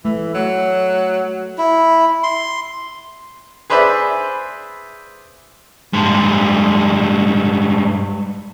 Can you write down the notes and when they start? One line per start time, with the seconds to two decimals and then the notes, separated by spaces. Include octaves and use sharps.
0.05 E3 A3
0.34 F#3
1.58 E4
2.23 C6
3.70 G#4 B4 C5 D5 E5 B5
5.93 G2 G#3